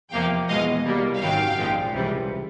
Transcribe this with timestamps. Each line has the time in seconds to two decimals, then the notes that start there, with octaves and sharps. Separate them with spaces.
0.11 E2 C3 F3 A#3 F5 G5
0.48 E2 B2 G#3 D#5 F5
0.84 C2 B2 G3 A#3
1.20 G#1 F#2 D#3 F#3 F5 G5
1.57 A#1 A#2 F3 G#3
1.94 C#2 C3 E3 G3